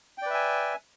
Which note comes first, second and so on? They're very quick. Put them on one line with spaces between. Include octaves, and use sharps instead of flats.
G5 D5 B4 E5 G#5